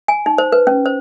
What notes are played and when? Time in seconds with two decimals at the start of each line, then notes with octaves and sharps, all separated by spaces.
0.08 G#5
0.26 D#4
0.38 C5
0.52 B4
0.67 C#4
0.86 C5